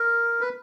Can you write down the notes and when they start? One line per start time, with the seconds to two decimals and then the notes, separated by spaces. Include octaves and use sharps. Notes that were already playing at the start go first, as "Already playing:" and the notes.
Already playing: A#4
0.41 B4